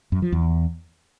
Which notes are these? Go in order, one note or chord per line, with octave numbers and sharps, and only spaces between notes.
F#2
F3
E2